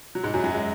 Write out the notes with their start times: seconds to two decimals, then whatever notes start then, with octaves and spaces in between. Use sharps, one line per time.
0.15 F#3
0.23 G#2 G#3
0.34 F#2 F#3
0.44 F#2 F#3
0.53 G#3